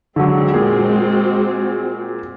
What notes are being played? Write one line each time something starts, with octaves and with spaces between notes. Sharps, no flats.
D3 F#3 G#3 C4 F#4
A#2 G#4